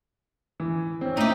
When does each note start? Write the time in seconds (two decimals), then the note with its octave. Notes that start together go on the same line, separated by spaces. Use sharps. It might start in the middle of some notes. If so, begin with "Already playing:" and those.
0.60 E3
1.01 C4 C#4
1.17 A3 C4 D#4 G4